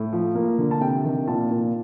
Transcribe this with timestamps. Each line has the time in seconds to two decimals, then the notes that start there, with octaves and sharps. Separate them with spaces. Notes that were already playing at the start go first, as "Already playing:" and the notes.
Already playing: A2
0.13 F3
0.35 A#3
0.58 D3
0.71 A5
0.81 C3 G5
1.04 D#3
1.27 A#2 A5
1.51 A#2